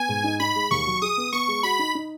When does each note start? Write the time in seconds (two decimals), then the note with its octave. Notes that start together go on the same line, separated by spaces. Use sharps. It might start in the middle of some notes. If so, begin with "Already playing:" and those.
Already playing: B3 G#5
0.09 G#2
0.24 D#4
0.40 D#4 B5
0.56 G#3
0.71 D#2 C#6
0.86 F#3
1.02 G#4 D#6
1.17 B3
1.33 B3 C#6
1.48 G#3
1.63 F#4 B5
1.79 D#4
1.95 D#4